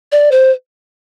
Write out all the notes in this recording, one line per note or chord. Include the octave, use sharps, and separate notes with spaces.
D5
C5